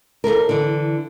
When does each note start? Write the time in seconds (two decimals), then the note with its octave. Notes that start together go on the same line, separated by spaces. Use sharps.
0.24 D#2 E4 A4 A#4
0.49 D3 E3